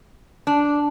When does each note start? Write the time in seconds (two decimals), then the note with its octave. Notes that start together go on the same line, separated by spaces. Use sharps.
0.47 D4